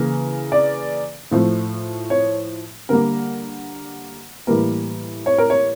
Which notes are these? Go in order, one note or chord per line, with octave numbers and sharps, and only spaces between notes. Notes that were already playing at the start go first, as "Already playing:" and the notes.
Already playing: C#3 E3 A#3
D5
A2 F3 A3
C#5
D3 G3 A#3 A#4
A2 E3 G3 A#3 A#4
C#5
A#4
C#5